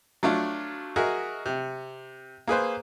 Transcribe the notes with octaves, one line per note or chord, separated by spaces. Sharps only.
F#3 A3 D4 F4
F#4 G#4 A#4 D#5 E5
C3
A#3 G#4 B4 C5